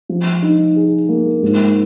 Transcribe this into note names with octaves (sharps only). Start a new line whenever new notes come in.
F3
D#4
G#4
A#3
G#2